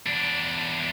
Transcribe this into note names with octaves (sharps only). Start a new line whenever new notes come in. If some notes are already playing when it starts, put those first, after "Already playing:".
E2 D4